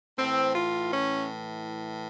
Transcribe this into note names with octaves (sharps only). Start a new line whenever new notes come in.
A2 E3 C4
F4
C#4